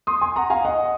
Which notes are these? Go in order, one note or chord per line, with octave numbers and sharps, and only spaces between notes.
C6 D#6
G#5 C6
F#5 A#5
F5 G#5
D#5 F#5